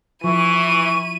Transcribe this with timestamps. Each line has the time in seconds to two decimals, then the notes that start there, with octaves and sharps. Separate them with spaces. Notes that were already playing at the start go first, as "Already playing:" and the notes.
0.24 E3 F3 E4 C#6 D#7